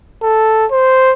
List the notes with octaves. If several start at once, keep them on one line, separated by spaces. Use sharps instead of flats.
A4
C5